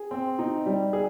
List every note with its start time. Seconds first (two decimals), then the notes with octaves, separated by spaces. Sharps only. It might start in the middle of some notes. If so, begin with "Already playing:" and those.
Already playing: G#4
0.11 C4
0.39 D#4
0.66 G3
0.93 G#4